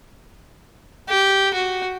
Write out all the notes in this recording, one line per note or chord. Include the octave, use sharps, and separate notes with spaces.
G4
F#4